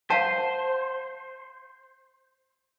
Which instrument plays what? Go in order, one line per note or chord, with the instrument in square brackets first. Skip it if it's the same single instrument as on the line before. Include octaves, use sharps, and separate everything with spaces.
[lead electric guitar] C5 [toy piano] F5 F#5 A5